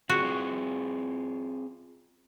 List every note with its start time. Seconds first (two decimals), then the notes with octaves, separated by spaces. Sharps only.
0.09 C4 F4 F#4 G#4